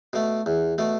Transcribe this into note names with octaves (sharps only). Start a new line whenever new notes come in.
B2 A3
E2
B2 A3